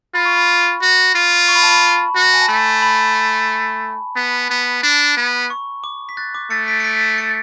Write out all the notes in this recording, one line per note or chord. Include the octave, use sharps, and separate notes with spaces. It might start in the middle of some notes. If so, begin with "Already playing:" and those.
F4 B5
C#6
B5
F#4
F4
C#6
B5
A5
B5
F#4
G#5
A5
A3 B5
B5
B3
B3
D4
B3
C#6
D6
B6
F#6 A6
D6
A3 A6 C#7
B6 D7
C#7
B6 D7
A6 C#7